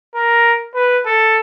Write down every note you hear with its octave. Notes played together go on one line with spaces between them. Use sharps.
A#4
B4
A4